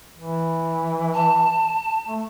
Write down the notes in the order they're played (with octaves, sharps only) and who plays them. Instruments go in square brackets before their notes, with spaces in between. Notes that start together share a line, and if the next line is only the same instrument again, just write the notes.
[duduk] E3
[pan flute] A5
[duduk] A3